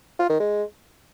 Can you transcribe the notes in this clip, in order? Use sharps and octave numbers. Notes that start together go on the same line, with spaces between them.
F4
D#3
G#3